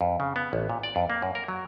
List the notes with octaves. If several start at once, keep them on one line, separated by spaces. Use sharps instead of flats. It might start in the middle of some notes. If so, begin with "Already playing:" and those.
F2
C#3
B3
A1
A#2
D5
F2
A#3
F#2
A#4
F#3